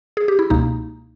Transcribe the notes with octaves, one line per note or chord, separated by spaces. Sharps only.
G#4
G4
E4
C#2 B2 A#3 D#4